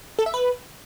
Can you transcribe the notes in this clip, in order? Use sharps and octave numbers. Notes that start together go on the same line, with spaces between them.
A4
E5
B4